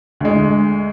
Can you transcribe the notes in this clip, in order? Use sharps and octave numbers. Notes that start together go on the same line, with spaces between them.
D2 G#3